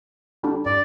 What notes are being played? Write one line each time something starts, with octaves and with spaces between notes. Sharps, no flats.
D3 G3 D4
G2 D5